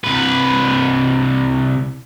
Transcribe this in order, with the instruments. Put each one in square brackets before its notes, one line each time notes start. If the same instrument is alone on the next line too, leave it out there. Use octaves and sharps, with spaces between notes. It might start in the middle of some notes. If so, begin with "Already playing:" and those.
[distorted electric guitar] C2 B4